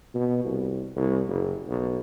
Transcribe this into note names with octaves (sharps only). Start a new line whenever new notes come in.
B2
C2
C2
F#1
B1